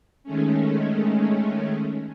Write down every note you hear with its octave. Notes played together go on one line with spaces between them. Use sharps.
D#3 G#3 A3 C#4